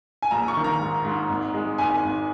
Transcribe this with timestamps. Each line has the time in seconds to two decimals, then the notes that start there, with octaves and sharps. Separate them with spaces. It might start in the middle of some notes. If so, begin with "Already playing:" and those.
0.22 G#5
0.31 A#1 A#5
0.48 C#6
0.57 D#3
0.64 A#5
0.80 G#2
1.05 G#2
1.29 G#1
1.54 G#3
1.78 G#1 G#5
2.03 G#1